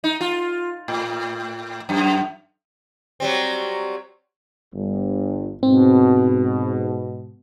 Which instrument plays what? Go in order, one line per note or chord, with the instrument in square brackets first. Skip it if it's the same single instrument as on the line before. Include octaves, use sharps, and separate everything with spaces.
[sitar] D#4
F4
A2
F#2
F#3 G3 C4
[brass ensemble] G1 G2
[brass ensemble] G#2 B2 [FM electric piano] C4